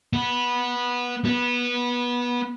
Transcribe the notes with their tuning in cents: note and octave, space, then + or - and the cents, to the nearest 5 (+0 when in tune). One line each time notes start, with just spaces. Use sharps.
B3 -15
B3 -20